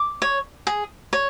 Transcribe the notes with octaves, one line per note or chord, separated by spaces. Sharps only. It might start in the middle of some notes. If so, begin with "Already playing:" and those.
Already playing: D6
C#5
G#4
C#5